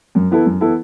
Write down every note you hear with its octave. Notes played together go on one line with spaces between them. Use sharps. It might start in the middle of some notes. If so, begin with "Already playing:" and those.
F#2
E3 B3 E4 A4
F#2
E3 B3 E4 A4